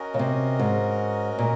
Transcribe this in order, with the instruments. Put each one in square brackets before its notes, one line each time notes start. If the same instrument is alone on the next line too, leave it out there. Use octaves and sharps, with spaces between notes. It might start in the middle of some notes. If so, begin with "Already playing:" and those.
Already playing: [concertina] C#4 F#4 A#4 D#5
[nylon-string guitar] C#3
C3
G#2
A#2